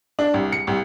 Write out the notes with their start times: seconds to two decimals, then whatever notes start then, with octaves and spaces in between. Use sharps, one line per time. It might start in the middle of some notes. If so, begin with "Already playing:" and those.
0.19 D4
0.34 C2
0.52 C#7
0.67 C2